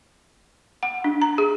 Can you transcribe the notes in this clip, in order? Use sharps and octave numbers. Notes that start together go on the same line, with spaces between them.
F#5
D4
A#5
G#4